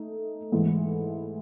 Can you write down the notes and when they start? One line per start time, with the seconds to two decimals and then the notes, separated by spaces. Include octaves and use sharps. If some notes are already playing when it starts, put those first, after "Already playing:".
Already playing: A3 D#4
0.52 G#2 E3 A3